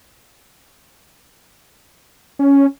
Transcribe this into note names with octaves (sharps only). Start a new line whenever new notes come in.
C#4